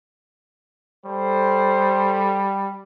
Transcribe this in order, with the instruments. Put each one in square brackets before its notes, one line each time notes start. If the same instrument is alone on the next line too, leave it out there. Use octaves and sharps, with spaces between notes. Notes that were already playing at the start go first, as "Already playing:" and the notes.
[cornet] G3 [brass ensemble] A4 C5